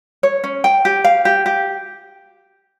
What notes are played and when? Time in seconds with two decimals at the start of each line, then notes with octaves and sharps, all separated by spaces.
0.23 C#5
0.44 C#4
0.64 G5
0.85 G4
1.04 F5
1.25 G4
1.46 G4